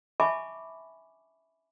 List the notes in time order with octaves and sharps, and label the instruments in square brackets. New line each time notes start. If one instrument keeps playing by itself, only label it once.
[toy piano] E5 G#5 A5 B5 C#6 D6